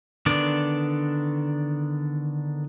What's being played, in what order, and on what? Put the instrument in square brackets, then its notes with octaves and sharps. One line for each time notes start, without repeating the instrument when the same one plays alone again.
[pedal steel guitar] D3 D#3 B3 D4 D5